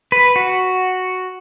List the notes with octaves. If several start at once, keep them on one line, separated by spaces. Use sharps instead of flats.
B4
F#4